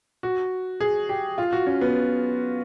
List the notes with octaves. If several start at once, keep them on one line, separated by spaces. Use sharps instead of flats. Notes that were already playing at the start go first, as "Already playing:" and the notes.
F#4
G#4
G4
F4
F#4
C#4
B3